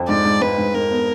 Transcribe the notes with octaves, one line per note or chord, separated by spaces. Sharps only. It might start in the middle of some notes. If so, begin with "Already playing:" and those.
Already playing: F2
G#2 D5
G#2
G#2 B4
G#2
G#2 A#4
B3